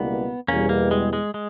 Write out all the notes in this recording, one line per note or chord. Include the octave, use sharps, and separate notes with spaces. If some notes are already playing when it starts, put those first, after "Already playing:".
Already playing: C#2 B2 G3 A#3 B3 E4
E2 B2 G3 A#3 C#4
A#3
G#3
G#3
G#3